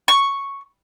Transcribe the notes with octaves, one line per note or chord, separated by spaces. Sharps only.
C#6